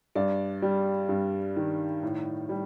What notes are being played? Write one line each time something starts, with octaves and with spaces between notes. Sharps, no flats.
G2 D5
G3
G2
D#3
A2
G3